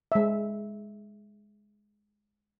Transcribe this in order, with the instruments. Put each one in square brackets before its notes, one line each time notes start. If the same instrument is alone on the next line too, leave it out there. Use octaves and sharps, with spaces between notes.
[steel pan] G#3 E5